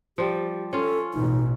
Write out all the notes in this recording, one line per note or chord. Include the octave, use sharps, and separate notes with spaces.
F3 G3 G4
C#4 F4 A4
A1 B2 D#4